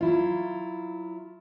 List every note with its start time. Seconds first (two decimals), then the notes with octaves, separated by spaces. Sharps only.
0.01 F#3 E4 F4